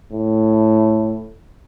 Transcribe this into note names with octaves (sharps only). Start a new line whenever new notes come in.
A2